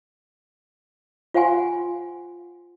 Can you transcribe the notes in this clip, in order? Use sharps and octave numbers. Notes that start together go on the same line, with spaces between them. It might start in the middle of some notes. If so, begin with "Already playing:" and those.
F4 C5 F5 F#5 G#5 C6